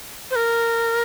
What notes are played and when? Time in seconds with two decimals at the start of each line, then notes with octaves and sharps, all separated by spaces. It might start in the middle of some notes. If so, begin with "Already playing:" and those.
0.31 C5
0.36 A#4